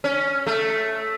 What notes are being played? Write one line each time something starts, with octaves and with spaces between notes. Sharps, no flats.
C#4
A3